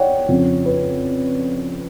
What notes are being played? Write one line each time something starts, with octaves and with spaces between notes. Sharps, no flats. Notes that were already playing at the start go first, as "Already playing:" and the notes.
Already playing: C#5 D5 F#5 G5
F2 C#3 F3
B4